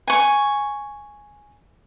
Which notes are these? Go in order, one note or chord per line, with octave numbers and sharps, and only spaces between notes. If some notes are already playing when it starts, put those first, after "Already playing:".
G#5 C#6